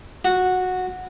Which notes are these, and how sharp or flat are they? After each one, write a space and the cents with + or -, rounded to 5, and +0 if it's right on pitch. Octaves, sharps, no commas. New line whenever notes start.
F#4 -10